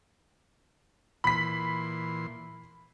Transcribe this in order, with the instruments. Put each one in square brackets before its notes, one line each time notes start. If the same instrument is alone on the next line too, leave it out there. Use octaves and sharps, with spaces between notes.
[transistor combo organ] A#2 E3 C6 [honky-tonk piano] B5 B6